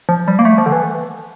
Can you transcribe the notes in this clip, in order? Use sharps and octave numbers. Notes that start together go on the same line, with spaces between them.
F3
G3
A#3
A3
F3
D3
E3